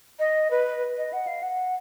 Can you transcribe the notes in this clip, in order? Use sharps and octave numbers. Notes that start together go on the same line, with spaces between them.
D#5
B4
D#5
F#5
F5
F#5